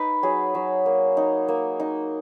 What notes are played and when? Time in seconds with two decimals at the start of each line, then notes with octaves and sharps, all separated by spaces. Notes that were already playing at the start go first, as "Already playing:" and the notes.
Already playing: D#4 B4
0.23 F#3 G#4
0.55 F#3
0.86 A#3
1.17 D#4
1.48 A#3
1.80 D#4